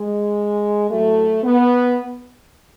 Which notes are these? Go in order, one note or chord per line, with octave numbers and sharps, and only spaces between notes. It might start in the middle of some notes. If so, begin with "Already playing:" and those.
Already playing: G#3
A2 F#3 A3
B3